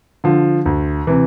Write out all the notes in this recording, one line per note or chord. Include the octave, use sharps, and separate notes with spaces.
D3 F3
D2
C3 E3